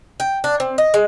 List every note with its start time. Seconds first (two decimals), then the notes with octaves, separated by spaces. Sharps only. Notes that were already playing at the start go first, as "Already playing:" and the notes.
0.20 G5
0.44 D4
0.60 C4
0.78 D#5
0.94 G#3